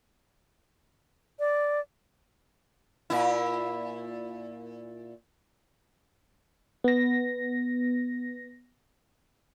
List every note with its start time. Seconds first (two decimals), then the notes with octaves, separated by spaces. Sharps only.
1.39 D5
3.10 A#2 E4
6.84 B3 A#6